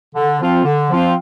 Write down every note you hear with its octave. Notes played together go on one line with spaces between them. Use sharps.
D3
F3 C4 F4
D3
F3 C4 F4